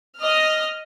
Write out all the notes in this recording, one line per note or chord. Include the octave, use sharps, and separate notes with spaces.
D#5 F6